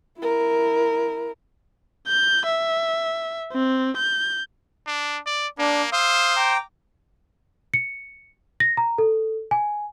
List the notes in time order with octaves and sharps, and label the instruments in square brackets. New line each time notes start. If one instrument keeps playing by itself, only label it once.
[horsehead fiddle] E4 A#4
[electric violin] G6
E5
C4
G6
[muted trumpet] D4
D5
[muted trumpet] A#3 [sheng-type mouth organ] D4
[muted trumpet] C5 [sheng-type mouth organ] F5 D#6 E6
[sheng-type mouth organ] G5 A#5 D6
[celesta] C#7
A#6
A#5
A4
G#5